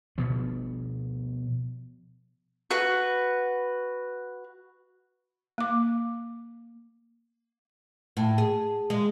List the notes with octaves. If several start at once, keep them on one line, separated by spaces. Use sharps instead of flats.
B2 F3 B3
F#4 B4
A#3 D6
A2
G#4
G#3